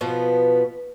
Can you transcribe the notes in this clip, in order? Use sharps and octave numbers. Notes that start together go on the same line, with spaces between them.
B2 F3 B3